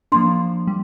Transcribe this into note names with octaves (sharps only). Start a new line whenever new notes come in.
F3 A#3 D4 C6
G3